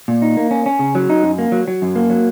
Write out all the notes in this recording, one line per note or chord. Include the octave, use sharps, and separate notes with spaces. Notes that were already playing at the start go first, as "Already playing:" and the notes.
A#2
D#4
A#3
C#4
C#4
C#3
F#3
D#4
F#2
A#3
F#3
F#3
F#2
A#3
F#3